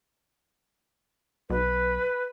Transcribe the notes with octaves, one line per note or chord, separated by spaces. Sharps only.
B1 B4